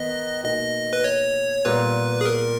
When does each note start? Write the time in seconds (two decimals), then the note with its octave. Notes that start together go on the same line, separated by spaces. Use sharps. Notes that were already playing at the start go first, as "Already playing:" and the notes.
Already playing: D#3 B3 D#5
0.43 B2 A#3 D#4 D#5
0.93 B4
1.04 C#5
1.65 A#2 G3 B3 B4
2.21 G#4
2.26 A#4